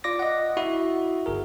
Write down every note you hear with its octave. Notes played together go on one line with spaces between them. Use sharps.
F4 D5 D6 A#6
D#5 F#5
E4 F#4 E5
G1 G#4 A#4